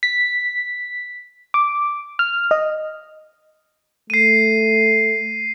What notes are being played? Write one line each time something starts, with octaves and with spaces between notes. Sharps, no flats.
B6
D6
F6
D#5
A3 C7 D#7